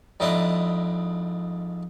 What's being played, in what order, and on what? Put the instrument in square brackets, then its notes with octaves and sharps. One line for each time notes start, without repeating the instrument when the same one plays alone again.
[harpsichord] F2 G#2 D4 E4 D#5 A#5